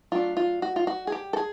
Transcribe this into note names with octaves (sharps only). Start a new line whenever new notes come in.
F#3 A3 D4 F4
F4
F#4
F4
F#4
G#4
G4
A4
G#4